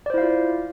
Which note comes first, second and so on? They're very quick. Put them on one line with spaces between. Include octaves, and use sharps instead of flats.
D5 C5 E4 F5 F4